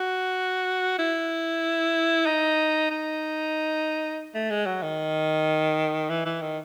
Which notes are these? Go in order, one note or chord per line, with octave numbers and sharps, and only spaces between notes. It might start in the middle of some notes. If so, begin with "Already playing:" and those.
Already playing: F#4
E4
D#4
D#4
A3
G#3
F#3
D#3
E3
E3
D#3